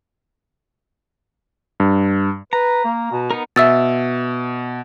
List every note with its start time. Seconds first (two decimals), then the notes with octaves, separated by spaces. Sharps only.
1.80 G2
2.53 B4 A#5
2.85 A#3
3.12 B2
3.31 B3 D#4 A#4
3.56 B2 E5 E6 A6